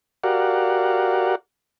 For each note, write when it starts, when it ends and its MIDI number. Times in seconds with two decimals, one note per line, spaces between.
0.24 1.35 66
0.24 1.35 67
0.24 1.35 70
0.24 1.35 74
0.24 1.35 77
0.24 1.35 78